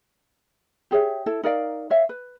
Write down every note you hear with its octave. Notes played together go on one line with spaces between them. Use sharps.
G4 G#4 C#5 E5
E4 A4
D#4 A#4 D5 F5
C#5 E5 F5
B4